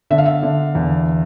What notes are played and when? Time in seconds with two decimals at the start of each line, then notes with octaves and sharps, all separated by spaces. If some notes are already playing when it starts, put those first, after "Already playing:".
0.10 D3 E5
0.18 F5
0.25 E5
0.43 D3
0.75 E2